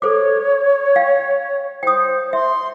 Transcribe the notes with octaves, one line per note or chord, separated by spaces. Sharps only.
A4 C5 C#5 D6
F5 G5
C5 G5 D#6
E5 C6